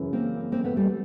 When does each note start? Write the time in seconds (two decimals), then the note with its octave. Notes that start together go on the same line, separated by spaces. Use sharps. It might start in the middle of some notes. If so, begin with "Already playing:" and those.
Already playing: F#2 C#3 E3
0.13 A#3 C4
0.52 A#3 C4
0.64 A3 B3
0.77 G3 A3